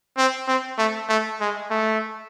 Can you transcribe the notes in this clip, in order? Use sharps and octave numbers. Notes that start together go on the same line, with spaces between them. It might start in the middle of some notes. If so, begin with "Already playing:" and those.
C4
C4
A3
A3
G#3
A3